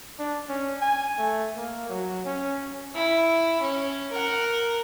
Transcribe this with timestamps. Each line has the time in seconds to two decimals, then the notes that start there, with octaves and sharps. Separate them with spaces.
0.19 D4
0.49 C#4
0.81 G#5
1.18 A3
1.56 A#3
1.89 F#3
2.25 C#4
2.94 E4
3.62 C#4
4.12 A#4 F#5